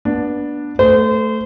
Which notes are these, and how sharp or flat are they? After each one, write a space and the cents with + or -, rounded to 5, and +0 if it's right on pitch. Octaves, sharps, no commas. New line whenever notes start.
B3 -25 D4 +0
A3 +0 C5 -30